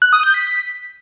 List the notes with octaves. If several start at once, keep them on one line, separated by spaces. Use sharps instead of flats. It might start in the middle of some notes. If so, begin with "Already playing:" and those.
F#6
D#6
G6
B6